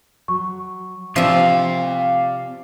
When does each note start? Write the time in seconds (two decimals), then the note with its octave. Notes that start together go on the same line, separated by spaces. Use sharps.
0.28 F#3 C#6
1.16 C3 F3 C4 D5 E5 F5